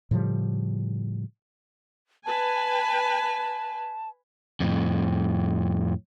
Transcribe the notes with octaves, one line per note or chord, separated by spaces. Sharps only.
A2 C#3 F3 G3
B4 G#5 A5
F2 A2